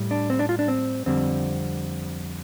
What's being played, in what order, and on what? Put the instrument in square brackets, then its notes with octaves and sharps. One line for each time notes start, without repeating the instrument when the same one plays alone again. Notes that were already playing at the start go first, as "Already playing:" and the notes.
Already playing: [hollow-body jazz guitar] A2 G3
D4
C4
D4
F4
D4
C4
F2 D3 G3 C4